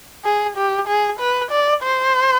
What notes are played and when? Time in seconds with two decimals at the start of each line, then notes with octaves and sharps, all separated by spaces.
0.25 G#4
0.57 G4
0.88 G#4
1.20 B4
1.51 D5
1.82 C5